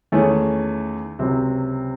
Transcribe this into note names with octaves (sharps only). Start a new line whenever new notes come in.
E2 D#3 A3 C#4 G#4
C#2 C3 F#3 C4